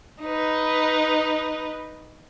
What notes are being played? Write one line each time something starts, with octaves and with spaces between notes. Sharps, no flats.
D#4 B4